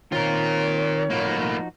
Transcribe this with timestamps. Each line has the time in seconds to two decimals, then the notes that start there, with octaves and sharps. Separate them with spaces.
0.12 D#3 C4 F4 A#4 C#5
1.10 A2 F3 A#3 D#4 F#4